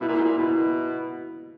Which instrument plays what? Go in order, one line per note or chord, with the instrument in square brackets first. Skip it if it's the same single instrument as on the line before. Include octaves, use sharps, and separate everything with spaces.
[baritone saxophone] B2 [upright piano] E4
[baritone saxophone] A#2
G#2
A#2
[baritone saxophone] B2 [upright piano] E4